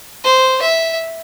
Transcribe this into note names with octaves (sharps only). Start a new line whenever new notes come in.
C5
E5